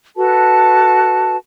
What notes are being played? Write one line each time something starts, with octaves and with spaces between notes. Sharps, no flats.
F#4 A4 B4 A5